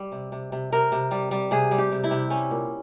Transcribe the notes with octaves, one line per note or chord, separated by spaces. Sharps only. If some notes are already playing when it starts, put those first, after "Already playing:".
Already playing: G3
C3
C3
C3
C3 A#4
C3
G3
G3
C3 G#4
G3
G4
C3
E4
C3
G3 C#4
A#2